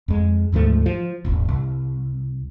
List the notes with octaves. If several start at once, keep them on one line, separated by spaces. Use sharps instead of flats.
F2 G#3
D2 G#2 F3 A3
F3
D#1 G#1
C2